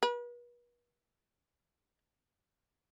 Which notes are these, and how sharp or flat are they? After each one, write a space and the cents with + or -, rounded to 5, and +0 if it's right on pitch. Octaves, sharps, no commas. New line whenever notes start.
B4 -40